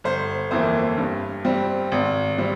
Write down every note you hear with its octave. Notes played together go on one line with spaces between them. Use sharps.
G1 C5
F2 E3 A#3 C5
G2
G3 C4
G#1
G3 C4